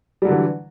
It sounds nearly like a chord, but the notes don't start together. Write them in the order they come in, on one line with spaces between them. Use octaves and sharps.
G3 F#3 D3 E3